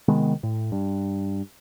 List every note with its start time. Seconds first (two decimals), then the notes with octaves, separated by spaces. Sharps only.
0.08 C3 D#3 G#3 B3
0.43 A2
0.72 G2